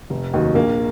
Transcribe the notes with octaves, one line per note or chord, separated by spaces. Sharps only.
F1
D#2 D#3 F#3
A#1 A#3